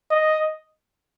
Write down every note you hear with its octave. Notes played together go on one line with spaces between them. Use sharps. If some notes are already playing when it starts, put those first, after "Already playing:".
D#5